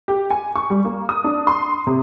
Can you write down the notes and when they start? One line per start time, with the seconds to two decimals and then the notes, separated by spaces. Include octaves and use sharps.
0.08 G4
0.30 G#5
0.56 C#6
0.70 G3
0.85 A#3
1.09 D#6
1.24 D4
1.47 C6
1.87 C3